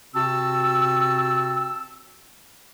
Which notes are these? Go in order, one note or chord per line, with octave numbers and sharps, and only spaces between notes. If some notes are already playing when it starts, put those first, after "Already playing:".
C3 C4 F#4 A5 E6